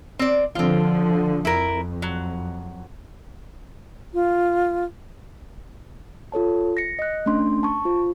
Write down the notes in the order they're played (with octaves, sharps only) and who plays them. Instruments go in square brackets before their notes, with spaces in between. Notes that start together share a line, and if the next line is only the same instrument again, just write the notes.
[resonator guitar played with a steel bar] C4 D5
[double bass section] D3 F3 [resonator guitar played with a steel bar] C4 F4
[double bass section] F2 [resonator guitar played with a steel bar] E4 A#4
[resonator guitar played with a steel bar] F#3
[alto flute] F4
[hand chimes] F4 A4 C#5 A5
A#6 C#7
D#5 F#6
A3 C#4 D4 C6
A5 C#6
F4 C5